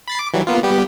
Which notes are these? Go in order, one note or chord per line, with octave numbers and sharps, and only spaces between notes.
B5 A6 C7
D6
E3 F#3 G3
A#3 B3 F4
G3 B3 G4